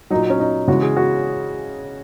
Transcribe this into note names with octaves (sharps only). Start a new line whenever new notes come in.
A#2 F#3 D#4
C#4
D#4
C#3 E3 G#3 F#4
G#4
F#4